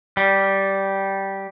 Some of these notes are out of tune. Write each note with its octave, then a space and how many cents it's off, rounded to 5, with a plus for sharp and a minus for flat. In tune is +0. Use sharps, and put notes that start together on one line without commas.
G3 -10